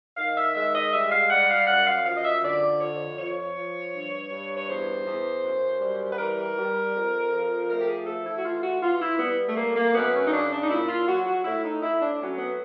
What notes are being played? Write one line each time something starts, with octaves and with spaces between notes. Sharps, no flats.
D#3 F5
E5
G#3 E5
D#5
G3 E5
F5
G3 F#5
F5
F#2 F#5
F5
F3 F5
D#5
E5
D3 D5
F2 C#5
F3 C#5
F3
G2
G2
C#5
E2 C5
E2
F#2
G3
B4
E3 A#4
G3
F2
F3
A3 A#4
G4
G#4
A3 A4
E4
F#4
E3 F4
F#4
E3 F4
E4
G3 B3
A3
A2 A#3
A#3
F#2 B3
C#4
D#4
C#3 D4
D4
D#4
A#2 E4
F4
F#3 F#4
F#4
A2 E4
D#4
A2 E4
D4
F#3 C#4
B3